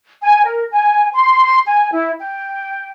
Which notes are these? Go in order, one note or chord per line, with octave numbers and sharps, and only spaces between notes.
G#5
A#4
G#5
C6
G#5
E4
G5